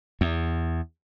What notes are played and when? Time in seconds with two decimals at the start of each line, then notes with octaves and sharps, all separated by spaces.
0.21 E2